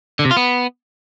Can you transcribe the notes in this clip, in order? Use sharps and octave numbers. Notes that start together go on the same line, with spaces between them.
D3
C3
F4
B3